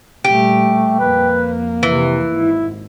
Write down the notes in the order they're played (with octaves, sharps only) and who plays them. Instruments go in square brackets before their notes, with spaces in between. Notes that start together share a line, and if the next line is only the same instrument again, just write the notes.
[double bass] A#2 G3 [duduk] A3 [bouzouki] G4
[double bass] F2 A#3 [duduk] B4
[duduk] C3 [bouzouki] E3
[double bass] G#1 [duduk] E4